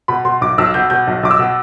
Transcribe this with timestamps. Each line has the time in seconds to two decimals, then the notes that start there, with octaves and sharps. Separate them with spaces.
0.08 B2 B5
0.25 B2 C6
0.41 B1 D6
0.58 B1 E6
0.74 B2 G6
0.90 B2 G6
1.07 B1
1.23 B1 D6
1.31 E6
1.39 B2